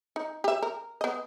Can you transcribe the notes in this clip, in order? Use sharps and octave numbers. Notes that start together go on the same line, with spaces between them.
D#4
G4 E5
A#4
B3 D#5